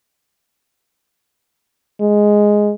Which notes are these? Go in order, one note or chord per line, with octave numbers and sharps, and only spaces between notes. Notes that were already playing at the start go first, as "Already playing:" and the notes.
G#3